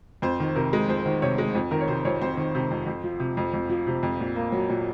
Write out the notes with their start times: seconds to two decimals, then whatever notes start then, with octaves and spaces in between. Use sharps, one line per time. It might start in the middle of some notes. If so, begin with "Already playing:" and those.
0.22 F2 C5
0.40 D#3
0.55 C3 A#4
0.73 G#3
0.88 F2 C5
1.06 D#3
1.22 C3 C#5
1.38 G#3
1.55 F2
1.71 D#3 A#4
1.81 C#5
1.88 C3 C5
2.05 F2 C#5
2.21 F2 C5
2.37 D#3
2.55 C3
2.71 F2
2.87 F2
3.04 F3
3.20 C3
3.37 F2
3.54 F2
3.70 F3
3.87 C3
4.03 F2
4.20 A#2
4.36 A#3
4.52 F#3
4.69 A#2